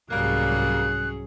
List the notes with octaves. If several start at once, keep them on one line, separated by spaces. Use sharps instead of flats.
C2 G#2 F#3 G3 A#3 C#4 G#4 F#6